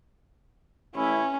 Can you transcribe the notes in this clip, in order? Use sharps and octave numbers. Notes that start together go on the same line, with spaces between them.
A1 C#4 E4